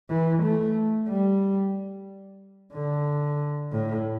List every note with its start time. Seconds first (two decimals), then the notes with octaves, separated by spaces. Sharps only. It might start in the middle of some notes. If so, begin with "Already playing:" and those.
0.10 E3
0.43 A3
1.08 G3
2.74 D3
3.72 A2